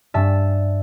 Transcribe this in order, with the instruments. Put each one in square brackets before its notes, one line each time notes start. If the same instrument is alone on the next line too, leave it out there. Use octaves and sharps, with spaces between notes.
[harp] G2 G3 D4 E5 A5